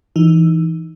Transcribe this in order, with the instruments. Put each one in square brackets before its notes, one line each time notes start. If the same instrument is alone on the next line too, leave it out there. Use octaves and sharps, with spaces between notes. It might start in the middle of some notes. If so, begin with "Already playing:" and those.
[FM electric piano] E3 D#4